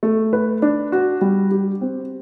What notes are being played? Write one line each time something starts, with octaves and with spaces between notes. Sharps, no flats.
A3
B4
D4
F#4
G3
G4
C4